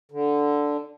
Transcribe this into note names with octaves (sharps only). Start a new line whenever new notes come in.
D3